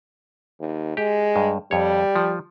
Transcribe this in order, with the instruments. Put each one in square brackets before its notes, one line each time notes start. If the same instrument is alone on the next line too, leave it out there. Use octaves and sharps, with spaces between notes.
[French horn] D#2
[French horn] G#3 [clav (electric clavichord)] G4
[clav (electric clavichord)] G2
[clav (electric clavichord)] F2 C#5 [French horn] G3
[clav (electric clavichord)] F3